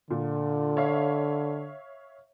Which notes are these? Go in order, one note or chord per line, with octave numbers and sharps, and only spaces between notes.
A#2 D3
C#5 E5 F5